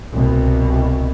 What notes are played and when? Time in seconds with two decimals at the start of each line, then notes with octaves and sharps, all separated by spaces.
0.12 C2 B2